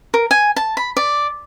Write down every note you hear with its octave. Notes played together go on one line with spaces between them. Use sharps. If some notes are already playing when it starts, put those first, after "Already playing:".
A#4
G#5
A5
B5
D5